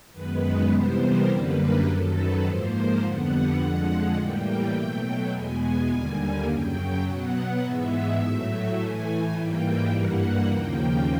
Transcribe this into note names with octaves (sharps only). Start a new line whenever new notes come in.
F#2 D#3 G#3 B3 B4
C3 E3 G3 B3 C5
A#4
F#2 D3 G3 A#3 B4
A#4
F#2 D#3 F#3 A4
B4
G#2 F3 A#3 C5
F2 D3 G3 B3 F#5
F2 D3 F3 G#3
A2 E3 G3 A#3 G5
B2 F#3 A3
E2 B2 G#3 B3 G#5
D#2 D3 G3 A#3
F#2 C#3 F#3 G5
B2 F#3 B3 F#5
G#2 E3 G#3 B3 E5
A2 F#3 A3
A2 E3 A3 G#5
G#5
G#2 E3 G3 A#3 G5
G2 E3 G3 A#3 F#5
D#2 C#3 F3 A#3 G5